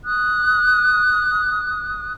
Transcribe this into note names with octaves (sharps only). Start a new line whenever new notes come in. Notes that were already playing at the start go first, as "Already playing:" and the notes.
D#6 F#6